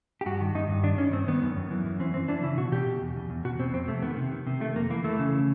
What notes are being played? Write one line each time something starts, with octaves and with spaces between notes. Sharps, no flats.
G4
G2 F#4
D#3
G2 D#4
G2
D#3 D4
G2 C#4
D#3 C4
D#3 B3
F#2
F#2
E3
F#2
E3 C4
E3 C4
E3 D4
C#3 E4
B2 F#4
B2 G4
B2
E2
E2
E2
B2 F#4
B2 C4
F2 C4
C3 A3
D#3 B3
C3
D#3
C3
D#3 A3
F2 A#3
E3 A#3
E3 A3
C#3